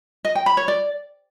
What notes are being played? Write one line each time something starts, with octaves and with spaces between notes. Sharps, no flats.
D#5
G5
B5
C#5
D5